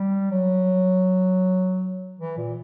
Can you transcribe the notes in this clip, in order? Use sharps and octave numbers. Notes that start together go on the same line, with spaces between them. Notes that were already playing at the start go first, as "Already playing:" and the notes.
Already playing: G3
F#3
E3
A#2